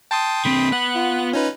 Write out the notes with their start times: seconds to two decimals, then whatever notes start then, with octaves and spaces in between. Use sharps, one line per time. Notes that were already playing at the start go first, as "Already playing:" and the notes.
0.11 G5 A5 C6 D#6
0.45 D3 C4 B5
0.72 B3 F#5 F#6
0.95 F4
1.33 C#4 D#4 B4